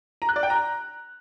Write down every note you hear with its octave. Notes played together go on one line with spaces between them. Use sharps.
A#5
F#6
D5
G5
A#5